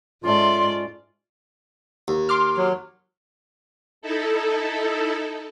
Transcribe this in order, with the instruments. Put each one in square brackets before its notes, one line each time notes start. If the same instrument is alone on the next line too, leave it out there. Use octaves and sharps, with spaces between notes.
[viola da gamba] G#2 D5 [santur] A3 C#4 D6 [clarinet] F4 [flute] C6
[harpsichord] D#2
[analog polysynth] C6 D6 F6
[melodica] F#3
[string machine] D#4 E4 A4